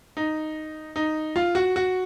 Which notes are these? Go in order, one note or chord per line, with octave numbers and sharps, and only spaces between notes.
D#4
D#4
F4
F#4
F#4